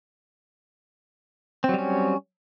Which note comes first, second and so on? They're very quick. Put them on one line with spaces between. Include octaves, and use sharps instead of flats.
C4 F#3 G3 C#4